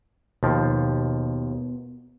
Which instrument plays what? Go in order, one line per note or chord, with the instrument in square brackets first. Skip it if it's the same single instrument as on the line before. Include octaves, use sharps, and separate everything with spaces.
[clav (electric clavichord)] D#2 F3 [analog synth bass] B2